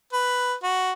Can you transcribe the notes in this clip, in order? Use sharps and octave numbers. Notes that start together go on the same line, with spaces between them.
B4
F#4